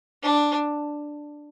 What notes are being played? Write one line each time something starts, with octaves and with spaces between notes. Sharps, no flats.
D4